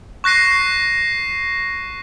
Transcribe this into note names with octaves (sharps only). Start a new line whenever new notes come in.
C#6 F#6 A#6 C7 D#7